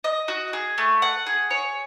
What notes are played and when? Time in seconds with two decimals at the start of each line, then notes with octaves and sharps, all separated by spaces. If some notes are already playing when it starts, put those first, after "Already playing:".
0.04 D#5
0.28 F#4
0.53 G#4
0.78 A3
1.02 F#5
1.27 G#4
1.50 C#5